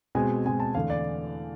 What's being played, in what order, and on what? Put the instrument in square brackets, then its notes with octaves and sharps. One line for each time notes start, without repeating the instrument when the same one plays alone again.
[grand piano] B2 G#3 C4 G#5
B2 G#3 C4 G#5
A5
E2 D3 A3 F5
D5